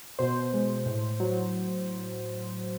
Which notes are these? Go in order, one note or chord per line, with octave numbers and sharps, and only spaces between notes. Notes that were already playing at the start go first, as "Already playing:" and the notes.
B2 C5
G#3
A2
F#3